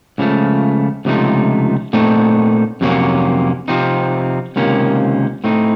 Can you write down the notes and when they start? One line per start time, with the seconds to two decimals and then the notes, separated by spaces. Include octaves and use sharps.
0.18 C#2 C#3 F3 A3
1.05 C#2 C3 F3 A3 D#4
1.93 A#2 A3 C4 D#4
2.81 F2 C3 F#3 A#3 C#4
3.68 C3 F3 C4 D#4
4.56 C#2 C3 D#3 A#3 C#4
5.44 A2 A3 C4 D#4